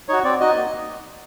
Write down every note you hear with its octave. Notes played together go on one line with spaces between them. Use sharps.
D#4 F#4 C#5
C4 D5
D#4 F#4 D#5
A#3